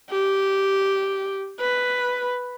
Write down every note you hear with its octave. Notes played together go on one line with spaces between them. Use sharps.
G4
B4